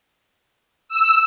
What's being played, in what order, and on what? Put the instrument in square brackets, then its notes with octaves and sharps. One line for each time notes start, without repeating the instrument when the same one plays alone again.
[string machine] E6